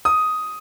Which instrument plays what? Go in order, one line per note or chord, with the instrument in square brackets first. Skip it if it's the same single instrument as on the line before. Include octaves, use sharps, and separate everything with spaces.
[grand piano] D#6